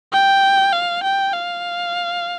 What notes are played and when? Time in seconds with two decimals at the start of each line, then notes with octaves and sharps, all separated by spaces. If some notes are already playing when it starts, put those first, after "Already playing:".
0.12 G5
0.73 F5
1.03 G5
1.33 F5